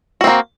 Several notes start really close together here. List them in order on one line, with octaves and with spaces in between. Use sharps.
F#4 C4 A#3